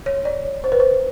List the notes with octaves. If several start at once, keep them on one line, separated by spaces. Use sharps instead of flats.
C#5
D5
C#5
C5
B4
C5